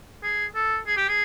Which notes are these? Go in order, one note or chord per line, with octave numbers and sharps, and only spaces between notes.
G#4
A4
G#4
G4
G#4